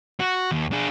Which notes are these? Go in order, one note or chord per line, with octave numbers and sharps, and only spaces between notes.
F#4
D#2
D4 G#4